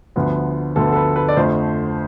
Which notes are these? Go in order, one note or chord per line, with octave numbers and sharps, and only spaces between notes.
D2 D3 F3 B3
D2 D3 F3 B3 A4
A4
B4
B4
D5
F2 D3 F3 A3 C5